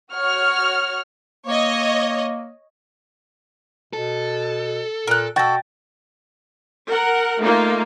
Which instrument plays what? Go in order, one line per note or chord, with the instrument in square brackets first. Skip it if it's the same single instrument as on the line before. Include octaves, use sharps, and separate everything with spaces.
[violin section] F#4 C#5 F#5 F6
[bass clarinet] A#3 [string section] C#5 D#5
[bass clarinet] B2 [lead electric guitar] A4
[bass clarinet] A#2 [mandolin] A#4 F#6
[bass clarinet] B2 [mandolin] F#4 A4 [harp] G5 A6 A#6
[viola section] A#4 F#5
A3 A#3 D#4 F4